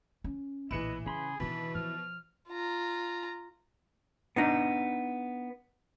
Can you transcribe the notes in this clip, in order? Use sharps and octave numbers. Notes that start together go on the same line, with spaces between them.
C#4
A#1 A2 E3 E4 B4 D#5 C#7 E7
C#3 G3 G#4 B5 C6
B2 D#3 E3 D4 B5
F3 F6
F4 A#5
B3 D4 D#4